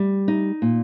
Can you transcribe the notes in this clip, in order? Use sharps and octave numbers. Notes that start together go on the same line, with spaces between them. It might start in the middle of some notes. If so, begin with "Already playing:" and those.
Already playing: G3
D#4
A#2